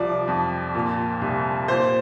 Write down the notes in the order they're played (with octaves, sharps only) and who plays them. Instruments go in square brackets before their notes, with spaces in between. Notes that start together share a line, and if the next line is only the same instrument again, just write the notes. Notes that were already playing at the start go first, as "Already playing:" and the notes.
Already playing: [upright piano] C2 F3 D5
F2
A#2
C2
A#2 C5